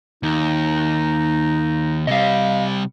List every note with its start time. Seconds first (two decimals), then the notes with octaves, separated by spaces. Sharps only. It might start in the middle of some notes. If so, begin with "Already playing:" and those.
0.23 D#2 D#4
2.07 C3 G3 D#5 F5